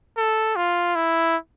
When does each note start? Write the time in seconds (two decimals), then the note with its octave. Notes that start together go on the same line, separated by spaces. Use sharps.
0.17 A4
0.56 F4
0.96 E4